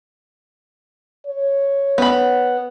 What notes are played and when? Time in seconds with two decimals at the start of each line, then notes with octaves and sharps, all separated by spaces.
1.26 C#5
1.98 B3 B5